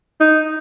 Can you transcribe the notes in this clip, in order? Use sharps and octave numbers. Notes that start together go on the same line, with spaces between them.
D#4